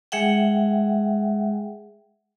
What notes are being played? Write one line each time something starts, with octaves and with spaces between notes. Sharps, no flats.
G#3 G#4 E5 F#5 G5